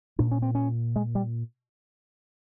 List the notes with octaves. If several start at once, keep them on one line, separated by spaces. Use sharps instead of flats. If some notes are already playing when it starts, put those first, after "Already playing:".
A#2 D4
C#4
C4
C#4
G#3
G3